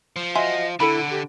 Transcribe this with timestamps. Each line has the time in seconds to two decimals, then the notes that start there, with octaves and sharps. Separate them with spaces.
0.16 F3
0.36 F#4 D#5 E5 G#5 C6
0.80 D3 E4 A4 F#5 B5
1.10 G4